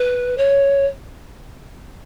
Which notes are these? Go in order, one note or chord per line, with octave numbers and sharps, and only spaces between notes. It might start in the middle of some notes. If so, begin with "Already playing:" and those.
Already playing: B4
C#5